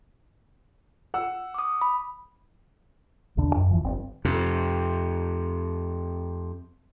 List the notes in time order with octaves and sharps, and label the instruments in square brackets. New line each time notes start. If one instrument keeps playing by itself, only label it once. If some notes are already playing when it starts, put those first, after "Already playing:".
[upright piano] F#5 E6
[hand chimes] D6 D#6
B5
[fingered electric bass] B1 E2 D3 D4
F#2
E2 E3 F3
G1 G2 C4
[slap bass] F2 C3